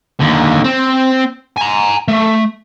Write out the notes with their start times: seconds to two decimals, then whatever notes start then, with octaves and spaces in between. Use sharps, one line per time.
0.20 D#2 D3
0.64 C4
1.58 G#5 A#5
2.08 A3